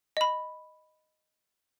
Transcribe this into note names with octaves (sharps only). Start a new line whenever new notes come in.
D#5 B5